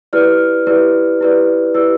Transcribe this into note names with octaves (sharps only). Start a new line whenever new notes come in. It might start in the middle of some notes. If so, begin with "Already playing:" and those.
E4 G4 B4 D5 F6
E4 G4 B4 D5
E4 G4 B4 D5
E4 G4 B4 D5 E6